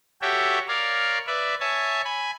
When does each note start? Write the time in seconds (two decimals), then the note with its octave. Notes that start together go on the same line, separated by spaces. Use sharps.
0.22 F#4 G4 A4 C#5 E5 G5
0.68 A#4 C#5 D5 F5
1.27 B4 D5 E5
1.60 C#5 E5 G#5 A5
2.05 G#5 B5